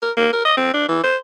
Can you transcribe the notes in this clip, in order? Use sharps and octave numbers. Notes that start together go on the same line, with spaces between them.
A#4
A#3
A#4
D#5
C4
D4
E3
C5